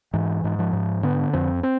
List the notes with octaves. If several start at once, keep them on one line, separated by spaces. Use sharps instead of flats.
G#2 E3
G#2
F3
G#2
D3 B3
F2 C4
C4